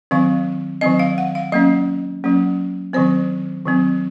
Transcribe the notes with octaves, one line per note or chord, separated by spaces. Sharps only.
D#3 F#3 C4 F5
D#3 F#3 C4 D#5
F5
F#5
F5
F#3 A#3 C#4 D#5
F#3 A#3 C#4
D#3 F#3 C4 C5
D#3 F#3 C4